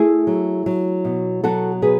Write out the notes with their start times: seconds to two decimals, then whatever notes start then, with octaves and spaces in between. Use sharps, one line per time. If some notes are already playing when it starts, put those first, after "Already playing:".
Already playing: A3 E4 G#4
0.27 F#3
0.66 F#3
1.05 B2
1.44 F#3 F#4 A4
1.82 B2 G#4 B4